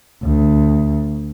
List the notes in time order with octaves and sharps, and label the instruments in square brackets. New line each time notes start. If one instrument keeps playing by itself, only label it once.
[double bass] D2